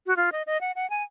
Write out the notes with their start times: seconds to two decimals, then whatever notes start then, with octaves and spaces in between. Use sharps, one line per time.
0.07 F#4
0.17 F4
0.32 D#5
0.47 D#5
0.61 F#5
0.76 F#5
0.90 G#5